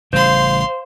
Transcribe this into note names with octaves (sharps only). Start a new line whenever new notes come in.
A1 C#3 G3 C5 F5 C6